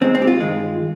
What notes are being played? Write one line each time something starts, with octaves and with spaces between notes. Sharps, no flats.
D#2 D#3 G#3 C4
C4
G4
F4
G2 D#3 G#3